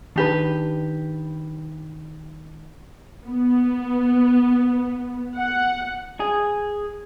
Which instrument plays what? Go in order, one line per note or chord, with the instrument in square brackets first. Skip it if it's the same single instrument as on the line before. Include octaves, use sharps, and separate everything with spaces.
[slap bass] D#3 [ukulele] D4 G4 B4
[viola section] B3
F#5
[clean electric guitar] G#4